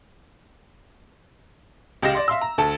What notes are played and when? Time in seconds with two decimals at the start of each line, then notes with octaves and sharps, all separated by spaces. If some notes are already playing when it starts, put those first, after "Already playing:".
2.02 C#2 G4 D#5 F5 A#6 E7
2.15 D5 C6
2.28 E5 F5 C6 E6
2.41 A#5
2.58 D2 A4 A5